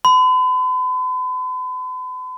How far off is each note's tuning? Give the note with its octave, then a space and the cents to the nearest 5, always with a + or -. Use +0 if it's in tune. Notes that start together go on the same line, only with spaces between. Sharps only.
B5 +45